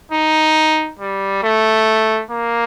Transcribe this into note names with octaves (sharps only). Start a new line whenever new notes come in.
D#4
G3
A3
A#3